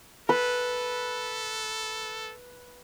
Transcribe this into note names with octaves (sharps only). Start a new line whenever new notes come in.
A4 B4